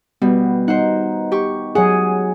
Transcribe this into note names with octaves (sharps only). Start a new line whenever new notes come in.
B2 G3 B3
D#4 C5 F#5
G4 C#6
F#3 G#4 F#5